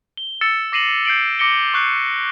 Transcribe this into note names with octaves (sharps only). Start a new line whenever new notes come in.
G7
E6 A6 C#7 E7
D6 A#6 C7 D#7 E7 F#7
G6 C7 D7 F#7
D6 A#6 C#7 G7
C#6 F#6 C7